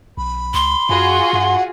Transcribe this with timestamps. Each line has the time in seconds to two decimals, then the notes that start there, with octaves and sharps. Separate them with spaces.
0.17 B1 B5
0.54 C#2 C6
0.89 F#2 F4 F#4 G#4
1.33 G2 F#5